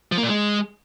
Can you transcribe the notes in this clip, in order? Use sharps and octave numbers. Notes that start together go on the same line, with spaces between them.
F3
A#3
A#2
G#3